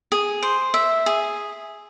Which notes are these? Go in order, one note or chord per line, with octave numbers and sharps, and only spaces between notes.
G#4
C5
E5
G#4